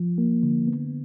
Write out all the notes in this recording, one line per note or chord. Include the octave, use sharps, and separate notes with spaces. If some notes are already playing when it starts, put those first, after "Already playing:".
Already playing: F3
A#3
D3
B3